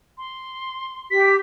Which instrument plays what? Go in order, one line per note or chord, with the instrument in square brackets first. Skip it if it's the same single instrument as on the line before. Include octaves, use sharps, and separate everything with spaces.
[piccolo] C6
[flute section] G4 [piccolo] B6